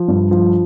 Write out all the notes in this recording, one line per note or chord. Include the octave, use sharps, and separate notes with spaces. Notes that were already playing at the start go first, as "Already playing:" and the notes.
Already playing: F3
G2
F3